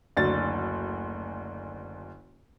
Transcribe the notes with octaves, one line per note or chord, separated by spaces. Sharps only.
F#1 D2 D4 A6